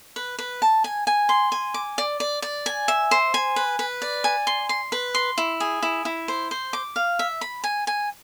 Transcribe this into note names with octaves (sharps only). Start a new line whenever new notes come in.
B4
B4
A5
G#5
G#5
C6
G#5
D6
D5
D5
D5
G#5
E5
C5
G#5
B4
B4
D5
G#5
C6
C6
B4
C6
E4
G#4
E4
E4
C5
C5
D6
F5
E5
B5
G#5
G#5